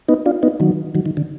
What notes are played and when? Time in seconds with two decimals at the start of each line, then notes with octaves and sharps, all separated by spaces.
0.08 B3 D#4
0.26 D4 F4
0.43 B3 D#4
0.60 D#3 F#3
0.95 D#3 F#3
1.06 D#3
1.17 D3